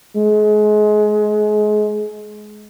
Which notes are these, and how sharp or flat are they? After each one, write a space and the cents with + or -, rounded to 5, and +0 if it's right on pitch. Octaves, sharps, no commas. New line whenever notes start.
G#3 +30